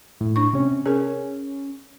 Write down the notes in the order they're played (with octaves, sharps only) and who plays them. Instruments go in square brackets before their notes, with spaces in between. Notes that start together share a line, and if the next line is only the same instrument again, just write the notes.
[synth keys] A2
[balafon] D4 C#6
[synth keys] C3 C#4
[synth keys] C#4 [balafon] G#4 A#4